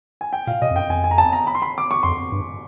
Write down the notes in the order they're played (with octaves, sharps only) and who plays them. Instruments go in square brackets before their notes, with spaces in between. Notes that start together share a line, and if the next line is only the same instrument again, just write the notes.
[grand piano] G#5
G5
[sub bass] A#2 [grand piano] F5
[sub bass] B2 [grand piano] D#5
[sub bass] F2
[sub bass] F#2 [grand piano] G5
[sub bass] F2 [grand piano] G#5
[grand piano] G#5
A#5
A5
A#5
B5
C6
B5
D6
C#6
[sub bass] F2 [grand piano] C6
[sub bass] G2